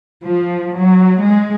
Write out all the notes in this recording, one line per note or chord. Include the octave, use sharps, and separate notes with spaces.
F3
F#3
G#3